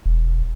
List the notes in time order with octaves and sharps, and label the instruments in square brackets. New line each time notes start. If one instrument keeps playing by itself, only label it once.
[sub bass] E1